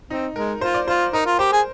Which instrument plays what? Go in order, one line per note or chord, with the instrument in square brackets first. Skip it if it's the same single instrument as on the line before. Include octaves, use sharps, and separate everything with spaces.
[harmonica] C4 [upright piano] D#4
[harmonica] G#3 [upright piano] A#4
[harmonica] F4 [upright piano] C5
[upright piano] D5
[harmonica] F4 [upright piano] C5
[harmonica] D#4 [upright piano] A#4
[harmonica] F4
[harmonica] G4 [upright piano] C5
[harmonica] G#4